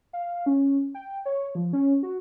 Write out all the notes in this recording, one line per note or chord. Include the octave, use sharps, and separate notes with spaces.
F5
C#4
G5
C#5
F3
C#4
F#4